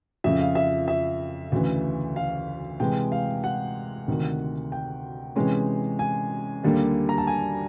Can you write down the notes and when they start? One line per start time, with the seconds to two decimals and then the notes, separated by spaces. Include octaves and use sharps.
0.24 F2 C#3 F3 E5
0.40 F5
0.55 E5
0.88 E5
1.52 D2 C#3 E3
2.16 F5
2.80 C3 E3 G#3 G5
3.12 F5
3.44 F#5
4.08 D2 C3 D#3
4.72 G5
5.36 C3 E3 G#3 C#4
5.99 G#5
6.63 D#2 D3 G3 A#3
7.09 A#5
7.18 A5
7.27 G#5